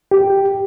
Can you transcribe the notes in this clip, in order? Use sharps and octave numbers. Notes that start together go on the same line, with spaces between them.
G4